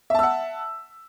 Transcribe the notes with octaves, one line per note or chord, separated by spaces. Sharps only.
E5 F#5 A5 E6